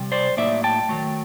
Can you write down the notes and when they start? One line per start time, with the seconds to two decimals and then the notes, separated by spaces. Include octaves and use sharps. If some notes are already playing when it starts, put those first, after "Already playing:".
Already playing: C3 G3
0.12 C5 D5
0.37 A2 F#3 A#3 D#4 D5 E5
0.64 G5 A5
0.89 D#3 F#3 A3